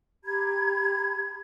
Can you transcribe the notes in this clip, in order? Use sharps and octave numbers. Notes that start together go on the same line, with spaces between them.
G4 A#5 B5 G#6